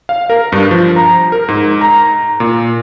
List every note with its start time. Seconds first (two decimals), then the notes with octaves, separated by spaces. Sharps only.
0.09 F5
0.30 A#4
0.52 G2
0.71 F3
0.96 A#5
1.32 A#4
1.48 G#2
1.81 A#5
2.40 A#2